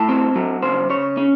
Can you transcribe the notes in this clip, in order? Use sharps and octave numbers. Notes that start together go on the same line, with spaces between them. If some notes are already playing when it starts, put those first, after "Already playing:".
Already playing: A2 A5
C4
F#3
C#3 C5
C#3 C#5
C#4